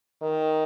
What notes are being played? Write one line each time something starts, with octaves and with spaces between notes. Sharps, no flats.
D#3